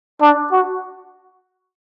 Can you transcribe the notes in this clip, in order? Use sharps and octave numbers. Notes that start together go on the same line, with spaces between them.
D4
F#4